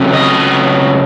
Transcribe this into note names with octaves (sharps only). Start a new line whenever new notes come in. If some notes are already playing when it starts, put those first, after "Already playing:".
Already playing: C#3 F#3 A3 C4
D#5